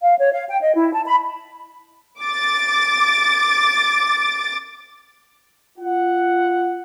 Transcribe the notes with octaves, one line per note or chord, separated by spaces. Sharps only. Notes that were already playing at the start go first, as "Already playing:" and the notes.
F5
C#5
F5
G5
D#5
E4
A5
B5
D6 A6
F4 F#5